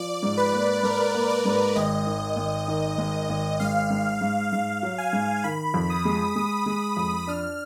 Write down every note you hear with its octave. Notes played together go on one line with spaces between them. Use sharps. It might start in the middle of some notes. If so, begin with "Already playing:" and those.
Already playing: F3 D5
G#2
B4
A#3
G#2 A#4
A#3
D5
G#2
G#1 D#5
D#3
G#1
D#3
G#1
G#1
G#2 F5
G#2
G#2
G#2 F5
F#3
G#5
G#2
D#3 B5
F2
D#6
G#3
G#3 D#6
G#3
F2
D4 F6